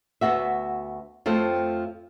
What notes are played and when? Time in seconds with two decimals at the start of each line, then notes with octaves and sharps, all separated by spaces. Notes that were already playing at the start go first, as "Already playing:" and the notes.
0.21 D2 G2 B3 F#4 E5
1.26 F2 F3 A3 C4